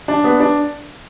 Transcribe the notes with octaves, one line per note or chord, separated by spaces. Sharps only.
D4
B3
D4